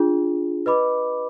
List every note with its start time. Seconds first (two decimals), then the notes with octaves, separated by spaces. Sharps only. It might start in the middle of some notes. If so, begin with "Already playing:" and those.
Already playing: D4 F4 G#4
0.66 B4 D#5 B5 D6